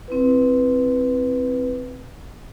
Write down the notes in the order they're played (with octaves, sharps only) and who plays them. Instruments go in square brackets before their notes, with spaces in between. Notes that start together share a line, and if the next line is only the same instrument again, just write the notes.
[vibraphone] C4 E4 B4